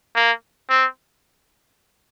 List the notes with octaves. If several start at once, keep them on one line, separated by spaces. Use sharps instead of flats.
A#3
C4